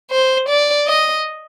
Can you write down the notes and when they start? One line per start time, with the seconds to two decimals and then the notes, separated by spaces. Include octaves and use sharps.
0.11 C5
0.49 D5
0.87 D#5